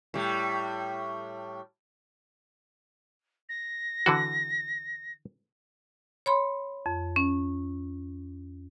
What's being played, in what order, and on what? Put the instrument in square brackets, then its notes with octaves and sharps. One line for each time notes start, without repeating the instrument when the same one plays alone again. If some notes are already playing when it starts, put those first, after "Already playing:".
[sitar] A2 G3
[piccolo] A#6
[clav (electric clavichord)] D3 E3 F#4
[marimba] C#5 B5 C6
F2
C#4